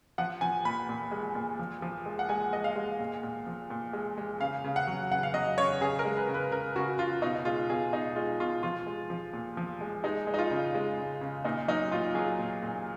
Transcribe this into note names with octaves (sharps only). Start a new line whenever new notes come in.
F3 F#5
F3 G#5
A#2 B5
A#2
G#3
A#2
F3
F3
G#3
F#5
G#3 G#5
G#3 D#5
F5
G#3
A#2
A#2
F3
A#2
G#3
G#3
C#3 F5
C#3
F#5
F#3
C#3 F#5
F5
F#3 D#5
C#3 C#5
C#3 G#4
A#4
G#3
B4
C#3
B4
C#3 A#4
C#3 F#4
C#3 F4
B2 D#4
G#3 F4
B2 G#4
B2 D#4
G#3 F4
B2 F4
F3 F4
G#3
F3
A#2
F3
G#3
G#3 D#4
G#3
D#4
F4
C#3
G#3
C#3
C#3
A#2 D#4
F#3 D#4
A#2 F4
F#3 G#4
A#2
A#2